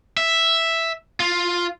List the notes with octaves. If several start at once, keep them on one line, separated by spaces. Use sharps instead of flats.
E5
F4